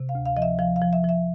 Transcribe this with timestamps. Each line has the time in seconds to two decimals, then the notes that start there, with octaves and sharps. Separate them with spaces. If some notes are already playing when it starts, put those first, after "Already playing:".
Already playing: C3
0.09 F5
0.15 D2
0.26 F5
0.37 F3 D#5
0.42 E5
0.59 F3 F5
0.76 F5
0.81 F3
0.93 E5
1.04 F3
1.09 E5